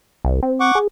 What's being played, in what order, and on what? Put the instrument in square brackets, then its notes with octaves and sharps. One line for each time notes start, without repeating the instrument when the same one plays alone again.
[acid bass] C2
C4
[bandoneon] F#5 C#6 D6
[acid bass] G#4